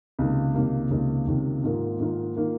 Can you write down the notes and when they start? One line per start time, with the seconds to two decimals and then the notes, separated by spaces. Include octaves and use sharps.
0.19 C#2 C3 D#3 A#3
0.55 C#2 C3 D#3 A#3
0.91 C#2 C3 D#3 A#3
1.27 C#2 C3 D#3 A#3
1.63 G#2 D#3 A#3 F4 A#4
2.00 G#2 D#3 A#3 F4 A#4
2.36 D#3 A#3 F4 A#4